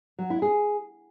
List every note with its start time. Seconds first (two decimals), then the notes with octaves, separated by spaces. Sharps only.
0.19 F#3
0.30 E4
0.42 G#4